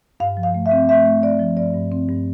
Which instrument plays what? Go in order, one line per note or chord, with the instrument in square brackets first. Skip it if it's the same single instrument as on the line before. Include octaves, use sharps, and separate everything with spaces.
[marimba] G2 F5
F3
F5
A3
E5
C4
A3 E5
A3
C4 D5
F3
G2 D5
G2
C4
G2